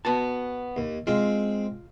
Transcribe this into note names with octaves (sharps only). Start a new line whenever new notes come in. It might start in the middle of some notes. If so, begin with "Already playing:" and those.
B3 F#4 A5
D#2
G#3 C4 F4